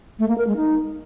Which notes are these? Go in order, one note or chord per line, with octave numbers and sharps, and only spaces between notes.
A3
A#3
A#4
G#3
D#4